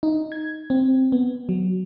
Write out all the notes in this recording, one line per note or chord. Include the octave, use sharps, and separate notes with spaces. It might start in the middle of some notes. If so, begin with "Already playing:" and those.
D#4
G#6
C4
B3
F#3